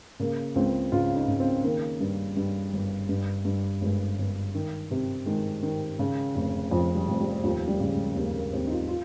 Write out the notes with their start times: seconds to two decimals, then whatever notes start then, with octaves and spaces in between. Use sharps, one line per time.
0.20 C#3 A#3
0.55 C#2 C4
0.92 C#3 F4
1.16 D#4
1.28 C#3
1.40 C4
1.64 D#3 A#3
2.01 G2
2.37 G2
2.73 G1
3.09 G2
3.45 G2
3.81 G1 G#3
4.18 G1
4.55 D#3
4.91 C3
5.26 D#3 G#3
5.63 D#3
5.99 C#3
6.35 F1
6.71 F2 F3
6.95 G3
7.08 F1
7.21 G3
7.44 D#2 F3
7.68 G3
7.80 C#3
7.92 G#3
8.16 D#2 A#3
8.35 A#3
8.53 D#2 C4
8.67 D#4
8.71 F4
8.89 F4